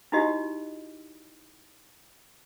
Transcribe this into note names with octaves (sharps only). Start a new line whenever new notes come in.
D#4 E4 F#4 G4 D#5